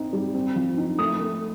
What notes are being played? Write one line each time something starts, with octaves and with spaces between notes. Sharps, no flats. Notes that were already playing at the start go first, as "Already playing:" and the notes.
Already playing: C4 D#4
G3
C4
F3
D#4
A3 D#6
A3